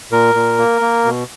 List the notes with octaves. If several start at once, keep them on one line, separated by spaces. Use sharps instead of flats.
A#2 A#4
A#2
A#3
A#3
B2